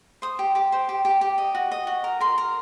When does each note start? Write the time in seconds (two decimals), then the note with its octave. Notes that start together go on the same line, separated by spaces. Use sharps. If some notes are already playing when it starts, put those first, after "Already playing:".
0.22 C5 D#6
0.39 G4
0.55 G4 D6
0.72 C5
0.89 G4
1.05 G4
1.21 G4
1.38 D#5
1.55 F#4
1.72 D#5
1.87 F#4
2.04 A#4
2.21 A#4 C6
2.38 A#4